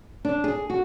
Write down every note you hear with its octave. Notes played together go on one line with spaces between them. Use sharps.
D4
G#4
F#4